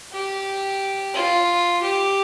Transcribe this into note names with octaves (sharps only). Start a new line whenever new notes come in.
G4
F4
G4